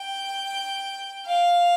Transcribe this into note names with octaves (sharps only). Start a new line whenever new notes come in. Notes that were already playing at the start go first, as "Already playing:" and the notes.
Already playing: G5
F5